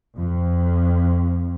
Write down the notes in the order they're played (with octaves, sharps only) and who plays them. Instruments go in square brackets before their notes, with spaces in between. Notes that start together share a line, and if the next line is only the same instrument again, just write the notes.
[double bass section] F2